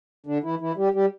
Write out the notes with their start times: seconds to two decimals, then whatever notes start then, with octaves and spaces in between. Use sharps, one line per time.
0.26 D3 D4
0.43 E3 E4
0.59 E3 E4
0.76 G3 G4
0.94 G3 G4